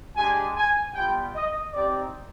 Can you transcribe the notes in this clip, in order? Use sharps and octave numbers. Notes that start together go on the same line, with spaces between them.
G#3 D4 G4 G#5
G#5
G3 B3 F4 G5
D#5
C4 D#4 G4 D5